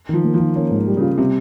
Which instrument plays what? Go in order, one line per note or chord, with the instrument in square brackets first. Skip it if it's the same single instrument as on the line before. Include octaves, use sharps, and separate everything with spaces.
[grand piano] D#3 [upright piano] F3
[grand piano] A#3
[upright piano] F3
[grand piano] D#3
[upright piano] A#3 [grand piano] C#4
[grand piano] G#2
G3
[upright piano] C#3
[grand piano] F4
[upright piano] C3 [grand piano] G3